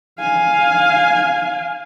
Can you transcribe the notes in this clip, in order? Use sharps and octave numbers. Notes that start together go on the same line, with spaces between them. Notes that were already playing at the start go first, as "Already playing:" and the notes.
F5 G#5